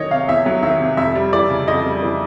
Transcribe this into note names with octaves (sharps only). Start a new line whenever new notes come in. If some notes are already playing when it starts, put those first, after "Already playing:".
Already playing: E2 D#3 F#3 C#5 D#5
C3 F5
E2 E5
F#3
D#3 E5
C3
F2 E5
G3
E3 D5
C#3
F2 D#5
G3
E3